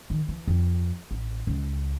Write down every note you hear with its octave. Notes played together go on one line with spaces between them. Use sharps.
D#3
E3
F2
A1
C#2